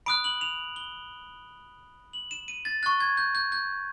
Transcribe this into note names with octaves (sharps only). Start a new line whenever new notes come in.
B5 D#6 F#6 D7
F#7
F7
G7
F#7
E7
D#7
A6
C#6 F#6 A6
G#6
G6
G6
G6